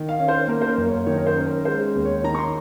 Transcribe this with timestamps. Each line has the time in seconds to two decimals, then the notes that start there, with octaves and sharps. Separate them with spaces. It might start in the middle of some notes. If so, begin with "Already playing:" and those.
Already playing: D#3
0.09 F5
0.19 C#4
0.28 C5
0.48 A#3 A#4
0.62 C5
0.67 A#4
0.78 F#2
0.88 C#5
1.06 D#3 C#5
1.17 A#4
1.27 C5
1.36 C#4
1.46 A#4
1.65 G#3 C5
1.95 D#2
2.05 C#5
2.24 D#3 A#5
2.35 C#6
2.39 C6